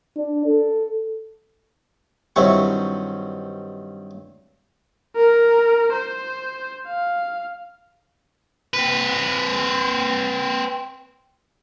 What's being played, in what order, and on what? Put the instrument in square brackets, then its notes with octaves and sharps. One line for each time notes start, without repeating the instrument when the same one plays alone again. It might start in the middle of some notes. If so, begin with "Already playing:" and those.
[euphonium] D4
A4
[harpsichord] G2 D#3 F#3 C4 E4 C#6
[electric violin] A#4
C5
F5
[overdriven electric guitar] C4 B4